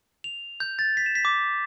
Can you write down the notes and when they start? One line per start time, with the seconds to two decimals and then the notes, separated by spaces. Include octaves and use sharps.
0.24 F7
0.60 G6
0.79 A6
0.97 B6
1.06 E7
1.15 B6
1.25 D6